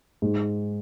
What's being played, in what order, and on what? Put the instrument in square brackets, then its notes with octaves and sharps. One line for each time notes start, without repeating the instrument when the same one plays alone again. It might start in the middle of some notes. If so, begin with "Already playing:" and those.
[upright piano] G#2